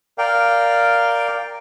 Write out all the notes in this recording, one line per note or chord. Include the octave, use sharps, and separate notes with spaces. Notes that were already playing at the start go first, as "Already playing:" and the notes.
A#4 D5 F5 G5